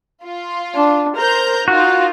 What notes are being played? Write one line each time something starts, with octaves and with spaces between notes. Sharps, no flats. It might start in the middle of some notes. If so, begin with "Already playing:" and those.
F4
D4
A#4 C5 A#5 G6
D#4 F4 F#4